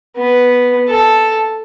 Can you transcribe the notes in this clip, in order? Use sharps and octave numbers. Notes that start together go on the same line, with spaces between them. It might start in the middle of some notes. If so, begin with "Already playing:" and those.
B3
A4